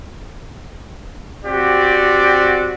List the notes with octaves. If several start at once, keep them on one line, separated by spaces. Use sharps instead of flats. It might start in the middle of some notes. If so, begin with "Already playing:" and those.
C4 F#4 G4 D5